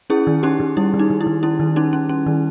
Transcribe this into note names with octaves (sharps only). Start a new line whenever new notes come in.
C#4 E4 G#4
D#3
C#4 D#4 G4
D#3
G3 E4
D#3
D#4
D#3
E4
D#3
C#4 E4
D#3
C#4 D#4
C#4
C#4
D#3